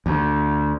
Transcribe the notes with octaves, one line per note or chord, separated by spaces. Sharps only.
D2